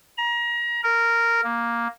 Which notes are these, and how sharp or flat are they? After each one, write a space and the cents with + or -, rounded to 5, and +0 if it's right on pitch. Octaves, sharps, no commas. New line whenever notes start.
A#5 +30
A#4 -10
A#3 +5